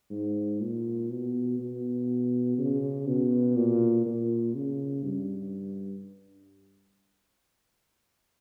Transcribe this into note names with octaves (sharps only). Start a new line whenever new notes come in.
G#2
A#2
B2
B2
C#3
B2
A#2
A#2
C#3
G2